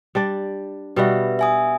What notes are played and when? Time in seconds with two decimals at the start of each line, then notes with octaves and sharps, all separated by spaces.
0.15 G3 D4 D5
0.96 B2 G3 F#4 B4 E5
1.39 E5 G#5 D#6